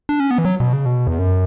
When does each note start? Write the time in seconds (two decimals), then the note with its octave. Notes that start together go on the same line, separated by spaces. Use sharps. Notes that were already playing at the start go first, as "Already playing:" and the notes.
0.09 D4
0.20 C#4
0.31 B3
0.38 E3
0.45 F#3
0.60 B2
0.73 C#3
0.85 B2
1.07 E2
1.19 F#2